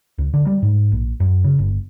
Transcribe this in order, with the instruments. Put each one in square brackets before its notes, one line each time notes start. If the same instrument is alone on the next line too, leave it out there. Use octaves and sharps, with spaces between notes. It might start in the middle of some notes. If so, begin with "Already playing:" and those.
[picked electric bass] C#2
D3
G3
G#2
A#1
F#2
C#3
G1